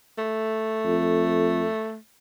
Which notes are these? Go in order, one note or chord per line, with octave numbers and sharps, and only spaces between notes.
A3
F2